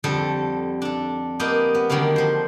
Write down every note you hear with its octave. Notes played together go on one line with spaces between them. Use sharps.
F2 D3 G3 A4
D4 A4
A#3 B3 G4 A#4 D#5
B3
D3 D#3 F#3 G3 A#3
F3 C5